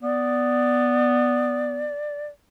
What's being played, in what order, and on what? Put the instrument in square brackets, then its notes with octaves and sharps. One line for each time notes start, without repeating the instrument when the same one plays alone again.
[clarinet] B3 [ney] D5